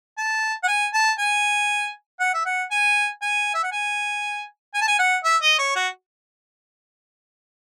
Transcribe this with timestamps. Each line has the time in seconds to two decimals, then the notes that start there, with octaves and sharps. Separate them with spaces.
0.18 A5
0.63 F#5
0.68 G#5
0.93 A5
1.19 G#5
2.20 F#5
2.34 E5
2.46 F#5
2.71 G#5
3.22 G#5
3.54 E5
3.63 F#5
3.72 G#5
4.74 G#5
4.81 A5
4.88 G#5
4.99 F#5
5.24 E5
5.42 D#5
5.59 C#5
5.76 F#4